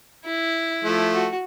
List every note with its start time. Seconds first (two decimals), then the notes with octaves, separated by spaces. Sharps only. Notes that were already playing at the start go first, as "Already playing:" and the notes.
0.25 E4
0.84 F3 A3
1.14 F#4